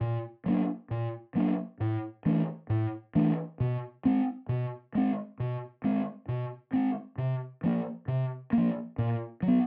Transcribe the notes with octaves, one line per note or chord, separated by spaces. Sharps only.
A#2
F#3 A#3 D4
A#2
F#3 A#3 D4
A2
E3 A3 D4
A2
E3 A3 D4
B2
G#3 C4
B2
G#3 C4
B2
G#3 C4
B2
G#3 C4
C3
F3 A#3
C3
F3 A#3
A#2
F#3
B3